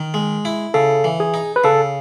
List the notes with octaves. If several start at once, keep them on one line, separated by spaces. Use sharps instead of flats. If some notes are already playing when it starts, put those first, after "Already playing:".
Already playing: D#3
G#3
E4
C#3 A4
E3
G#4
D#4
B4
C#3 A4